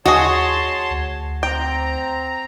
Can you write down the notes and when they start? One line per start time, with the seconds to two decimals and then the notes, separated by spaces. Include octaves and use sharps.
0.06 D#2 F#4 G#4 C#5 D#5 A5 C6
0.90 D2
1.43 C4 G5 A#5